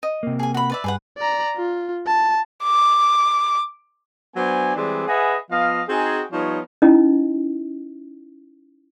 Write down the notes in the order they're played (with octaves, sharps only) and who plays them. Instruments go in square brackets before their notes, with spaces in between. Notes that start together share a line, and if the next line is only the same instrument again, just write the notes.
[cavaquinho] D#5
[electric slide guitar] C3 A#3
[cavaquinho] G#4 G#5
F#4 B5
B4 D5 E5
[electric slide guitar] G2 [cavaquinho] G#4 B4 F#5
[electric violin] D5 A#5
F4
A5
[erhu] D6
[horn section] F#3 B3 D4 C5 G#5
E3 G3 G#3 C4 G#4 D5
G#4 B4 D#5 E5 F#5 G#5
F3 B3 D#5 F5
C4 D#4 F#4 G#4
F3 G3 B3 D#4 C#5
[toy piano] C#4 D#4 E4 D#5